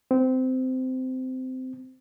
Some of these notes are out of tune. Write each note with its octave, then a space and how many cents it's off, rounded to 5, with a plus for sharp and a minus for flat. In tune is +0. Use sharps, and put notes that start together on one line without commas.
C4 -20